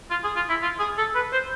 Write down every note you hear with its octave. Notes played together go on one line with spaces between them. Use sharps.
F4
G#4
F4
E4
F4
G#4
A4
B4
C5